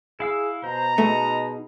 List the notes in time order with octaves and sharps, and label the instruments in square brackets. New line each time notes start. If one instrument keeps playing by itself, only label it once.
[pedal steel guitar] E4 F5 E6 [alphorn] G#4
[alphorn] B2 [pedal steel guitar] C5 [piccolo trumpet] A#5
[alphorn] B2 [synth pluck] A3 [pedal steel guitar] D#4 G#4